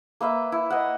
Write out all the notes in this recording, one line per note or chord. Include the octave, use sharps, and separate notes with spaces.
A#3 B4 E5
E4
D#5 F#5